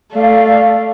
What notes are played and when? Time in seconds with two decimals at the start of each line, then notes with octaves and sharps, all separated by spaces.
0.13 A3 D5 F5